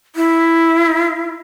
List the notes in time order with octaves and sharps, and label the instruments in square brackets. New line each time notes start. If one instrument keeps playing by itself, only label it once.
[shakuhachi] E4